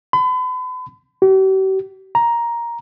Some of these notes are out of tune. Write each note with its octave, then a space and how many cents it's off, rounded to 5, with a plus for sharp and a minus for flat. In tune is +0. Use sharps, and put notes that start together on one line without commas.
B5 +40
G4 -45
A#5 +10